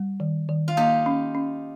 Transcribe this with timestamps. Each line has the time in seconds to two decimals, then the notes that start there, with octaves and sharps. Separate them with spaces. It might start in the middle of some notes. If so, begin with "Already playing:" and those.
Already playing: G3
0.20 D#3
0.49 D#3
0.68 F4
0.77 A#3 D#4 G4
1.06 C#4
1.35 C#4